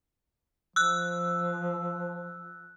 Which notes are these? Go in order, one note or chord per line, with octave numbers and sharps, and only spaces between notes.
F3 E6 F#6